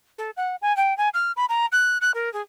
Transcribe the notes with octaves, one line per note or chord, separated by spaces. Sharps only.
A4
F#5
G#5
G5
G#5
F6
B5
A#5
F#6
F#6
A#4
G#4